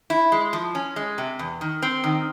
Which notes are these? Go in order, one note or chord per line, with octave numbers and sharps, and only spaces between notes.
E4
G#3
F3
C#4
G#3
C3
E2
D#3
C4
D#3